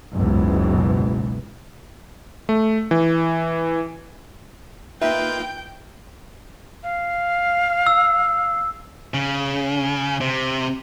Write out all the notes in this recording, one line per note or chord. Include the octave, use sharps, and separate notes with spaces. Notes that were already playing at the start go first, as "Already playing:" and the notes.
F#1 C#2 G#2 B2 E3
A3
E3
A#3 D#4 F4 B4 E5 G5
F5
E6
C#3
C3